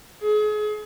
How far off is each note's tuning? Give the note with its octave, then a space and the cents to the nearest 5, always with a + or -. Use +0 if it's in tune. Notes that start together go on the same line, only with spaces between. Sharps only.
G#4 +35